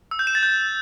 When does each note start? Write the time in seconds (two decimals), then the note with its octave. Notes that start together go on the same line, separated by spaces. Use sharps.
0.11 E6
0.19 G6
0.27 E7
0.35 A6
0.43 G6